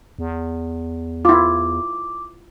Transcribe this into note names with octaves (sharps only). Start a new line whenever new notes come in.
E2
E4 F4 D6